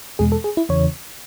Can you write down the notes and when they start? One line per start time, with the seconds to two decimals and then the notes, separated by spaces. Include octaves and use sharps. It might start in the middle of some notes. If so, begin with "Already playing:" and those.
0.19 E2 B2 G#3 G#4
0.32 A4
0.44 G#4
0.57 E4
0.69 E2 C#3 E3 C#5